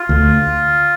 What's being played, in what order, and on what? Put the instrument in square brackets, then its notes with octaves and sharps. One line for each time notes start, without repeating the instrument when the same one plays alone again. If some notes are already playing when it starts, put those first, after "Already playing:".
Already playing: [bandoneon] F4
[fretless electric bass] D2